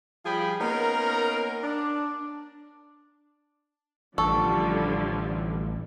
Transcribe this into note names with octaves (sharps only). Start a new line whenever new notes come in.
F3 G3 F4 G#4 G5 B5
A#3 B3 C#4 D#4 A#4
D4
A1 D3 F3 G3 A4 C#6